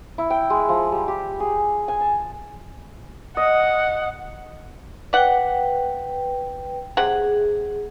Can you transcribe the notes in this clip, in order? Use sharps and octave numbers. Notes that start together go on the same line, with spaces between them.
E4
G5
G#3
F3
G3
G4
G#4
G#5
A5
D#5 F#5
B4 D5 F#5 G5
C3 G#4 F#5